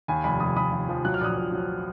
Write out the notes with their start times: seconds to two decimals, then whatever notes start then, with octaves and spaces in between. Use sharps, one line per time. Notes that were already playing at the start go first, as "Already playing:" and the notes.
0.08 D#2 G#5 B5
0.24 F1 G#5 B5
0.40 F1 B5 D#6
0.56 F1 B5 D#6
0.72 D#2
0.89 F3
1.05 F#3 F#6
1.14 F6
1.21 A#1 D#6 F#6
1.37 A#1
1.52 F#3